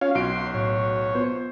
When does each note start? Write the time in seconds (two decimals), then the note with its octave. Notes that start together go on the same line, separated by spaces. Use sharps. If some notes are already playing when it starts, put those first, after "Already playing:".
0.01 C#4 F4 C#5 F5
0.15 B1 F#4 C6 D7
0.54 A2 C#5
1.15 B3 F4 B4 C5